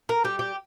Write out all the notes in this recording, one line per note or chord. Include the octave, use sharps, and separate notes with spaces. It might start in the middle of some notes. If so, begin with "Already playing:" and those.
A#4
G3 G4
G4